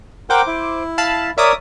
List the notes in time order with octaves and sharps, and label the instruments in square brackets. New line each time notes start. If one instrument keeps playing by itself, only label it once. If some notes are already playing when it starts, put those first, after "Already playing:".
[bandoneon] A#4 F#5 G5 [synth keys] C5 D6
[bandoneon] E4
[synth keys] F5 A5 B5
[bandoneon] A#4 C#5 D5 [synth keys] E5 D6 D#6